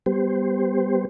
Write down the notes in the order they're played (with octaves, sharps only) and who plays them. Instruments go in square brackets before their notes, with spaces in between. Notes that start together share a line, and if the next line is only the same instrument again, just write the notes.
[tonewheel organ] G3 B3 G4 C5